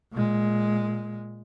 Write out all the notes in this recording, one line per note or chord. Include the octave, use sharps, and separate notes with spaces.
A#2 G#3